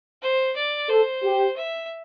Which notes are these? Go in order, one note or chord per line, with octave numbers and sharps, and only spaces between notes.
C5
D5
A4 C5
G4
E5